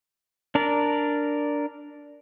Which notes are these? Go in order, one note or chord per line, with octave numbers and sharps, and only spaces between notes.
D4 A#4 D5